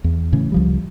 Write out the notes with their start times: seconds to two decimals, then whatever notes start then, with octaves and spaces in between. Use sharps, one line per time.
0.04 E2
0.32 A2 C#3 E3
0.52 C#2 F3 G3